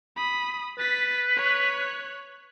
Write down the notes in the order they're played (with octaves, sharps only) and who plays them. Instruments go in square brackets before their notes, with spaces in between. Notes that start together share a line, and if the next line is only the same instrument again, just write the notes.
[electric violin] B5 D#6
[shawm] B4 [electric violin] A6 B6
[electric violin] C#5 F#6